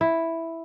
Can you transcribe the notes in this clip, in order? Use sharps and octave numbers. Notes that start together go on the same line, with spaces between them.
E4